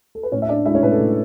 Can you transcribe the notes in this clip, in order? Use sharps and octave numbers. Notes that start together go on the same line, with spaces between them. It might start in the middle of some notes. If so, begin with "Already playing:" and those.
A4
B4
A2 C#4 C#5
E5
D4 D5
G#3 E4 E5
C#4 C#5
A2 B4
A4
A2